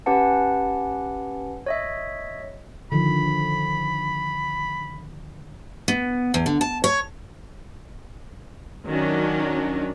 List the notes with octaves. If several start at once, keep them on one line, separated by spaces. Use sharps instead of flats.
C#4 G4 B4 F#5 A5
C#5 D#5 E5
D3 D#3 F3 B5
B3
E2
D3
A5
C#5
D#3 F#3 C#4 D4